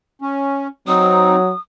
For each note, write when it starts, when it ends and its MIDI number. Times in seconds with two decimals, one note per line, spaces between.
0.21 0.67 61
0.88 1.52 54
0.88 1.36 60
0.88 1.36 63
0.88 1.59 87